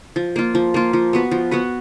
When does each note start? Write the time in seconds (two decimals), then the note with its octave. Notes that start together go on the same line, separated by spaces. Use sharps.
0.16 F3
0.36 A#3 F4
0.55 F3
0.74 A#3 F4
0.93 F3
1.13 B3 F#4 B4
1.31 F3
1.51 B3 F#4 B4